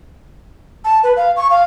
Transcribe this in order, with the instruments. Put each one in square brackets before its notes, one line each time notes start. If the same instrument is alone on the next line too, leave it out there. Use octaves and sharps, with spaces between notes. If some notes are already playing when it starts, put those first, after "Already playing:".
[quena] A5
B4
F5
C#6
F5